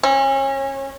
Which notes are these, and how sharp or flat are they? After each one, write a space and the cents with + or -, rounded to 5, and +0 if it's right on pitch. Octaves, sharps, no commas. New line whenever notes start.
C#4 -30